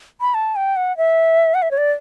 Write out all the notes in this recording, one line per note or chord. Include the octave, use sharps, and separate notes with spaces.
B5
A5
G5
F#5
E5
F#5
E5
C#5
D5